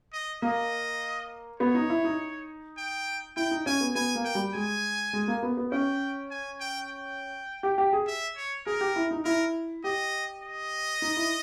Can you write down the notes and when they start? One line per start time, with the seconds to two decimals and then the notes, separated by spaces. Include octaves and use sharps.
0.13 D#5
0.42 A#3 D#5
1.60 B3 C#5
1.75 D#4
1.90 E4
2.04 D#4
2.78 G5
3.36 E4 G5
3.51 D#4
3.66 C#4 G#5
3.81 B3
3.95 B3 G#5
4.15 A#3
4.25 G5
4.35 G3
4.54 G#3 G#5
5.13 G#3
5.28 A#3
5.43 B3
5.57 B3
5.72 C#4 G5
6.31 G#5
6.60 G5
6.90 G5
7.63 G4
7.78 G4
7.93 G#4
8.08 E5
8.37 C#5
8.66 G#4 A#4
8.81 G4
8.96 E4
9.11 D#4
9.25 E4 A#4
9.84 G4 D#5
10.43 D#5
11.02 D#4
11.17 E4